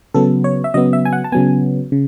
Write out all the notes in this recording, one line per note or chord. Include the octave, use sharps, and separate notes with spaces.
C#3 F#3 B3 A4
C#5
E5
C#3 F#3 B3 D#5
E5
G#5
F#5
A5
C#3 F#3 B3 G#5
C#3